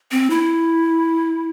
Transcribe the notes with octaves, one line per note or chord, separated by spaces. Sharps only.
C4
E4